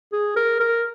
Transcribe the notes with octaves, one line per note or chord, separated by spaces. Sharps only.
G#4
A#4
A#4